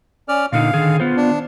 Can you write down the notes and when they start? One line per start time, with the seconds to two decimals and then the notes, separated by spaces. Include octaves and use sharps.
0.29 C#4 D5 F6
0.52 A#2 D3 D#4 F5
0.74 D3 D#3 G#4
1.00 B3 F4 C5
1.17 D4